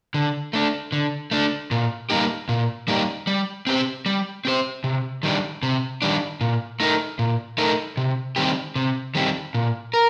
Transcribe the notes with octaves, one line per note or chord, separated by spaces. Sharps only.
D3
A3 D4
D3
A3 D4
A#2
G3 A#3 D#4 G4
A#2
G3 A#3 D#4 G4
G3
C4 G4 C5
G3
C4 G4 C5
C3
D#3 G3 D4
C3
D#3 G3 D4
A#2
A3 D#4 A#4
A#2
A3 D#4 A#4
C3
D#3 G3 C4 G4
C3
D#3 G3 C4 G4
A#2
A#4